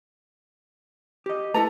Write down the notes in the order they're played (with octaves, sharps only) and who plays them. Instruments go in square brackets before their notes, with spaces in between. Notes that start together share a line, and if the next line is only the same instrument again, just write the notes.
[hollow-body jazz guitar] G4 D#5
[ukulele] E4 A4 A#5 [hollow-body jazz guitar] B4 [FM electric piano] A5